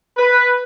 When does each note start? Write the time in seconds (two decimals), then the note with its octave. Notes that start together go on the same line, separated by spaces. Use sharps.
0.16 B4